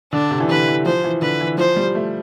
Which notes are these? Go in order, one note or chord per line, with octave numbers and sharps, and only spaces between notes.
D3 D4
C3
E3
D3 B4
E3
F3 C5
E3
D3 B4
E3
F3 C5
G3
A3